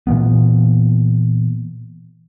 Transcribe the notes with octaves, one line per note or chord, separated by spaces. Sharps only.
A#2 E3 A#3 B3